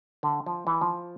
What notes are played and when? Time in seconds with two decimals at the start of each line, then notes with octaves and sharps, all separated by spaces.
0.23 D3
0.46 F3
0.67 E3
0.81 F3